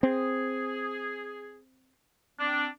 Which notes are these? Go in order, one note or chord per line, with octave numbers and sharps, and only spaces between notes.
C4 G#4
C4 D4